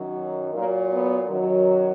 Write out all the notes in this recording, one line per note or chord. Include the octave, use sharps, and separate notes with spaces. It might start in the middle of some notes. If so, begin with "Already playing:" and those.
Already playing: F#2 D#3 F#3
A#2 F#3 A#3
B3
F#2 D#3 F#3